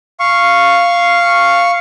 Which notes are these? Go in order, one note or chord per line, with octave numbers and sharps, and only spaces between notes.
F5 C#6